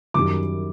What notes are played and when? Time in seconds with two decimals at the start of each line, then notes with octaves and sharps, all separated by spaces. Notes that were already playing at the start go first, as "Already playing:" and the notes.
0.14 F#2 D#3 G3 D6